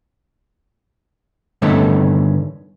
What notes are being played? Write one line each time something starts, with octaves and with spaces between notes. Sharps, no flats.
G2 D3 D#3 A3 B3 C#4